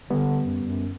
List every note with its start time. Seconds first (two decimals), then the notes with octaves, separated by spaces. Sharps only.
0.10 D3 G3 B3
0.46 F#2
0.63 F#2